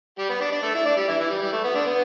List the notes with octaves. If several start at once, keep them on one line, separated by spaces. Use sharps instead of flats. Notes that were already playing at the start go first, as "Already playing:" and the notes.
G3 G4
B3 B4
D4 D5
D4 D5
A3 A4
E4 E5
D4 D5
G3 G4
E3 E4
E3
G3
G3
A3
B3
D3 D4
B3